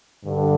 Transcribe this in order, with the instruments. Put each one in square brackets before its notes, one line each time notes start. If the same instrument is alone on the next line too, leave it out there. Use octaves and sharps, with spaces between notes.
[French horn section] G2 D3